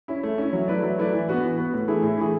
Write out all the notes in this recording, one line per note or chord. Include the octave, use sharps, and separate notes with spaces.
C#4 E4
A3
C#4 E4
F#3
A3 E4 B4 D5
F#3
A3 E4 B4 D5
E3
B3 F#4 B4
E3
B3 F#4 B4
A2
E3 A3 E4 G#4
A2
E3 A3 E4 G#4